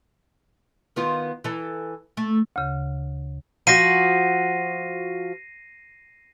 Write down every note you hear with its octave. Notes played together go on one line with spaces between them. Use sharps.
D#3 B3 F4
E3 A4
A3
D2 C#3
F3 F#4 A#6 C7 D#7